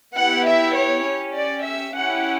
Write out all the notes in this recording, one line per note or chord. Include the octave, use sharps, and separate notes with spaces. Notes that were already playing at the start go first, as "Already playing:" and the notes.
B3 E4 G4 F#5
E5
C#5
C#4
G4
D5
E5
C#4 E4 G4 F#5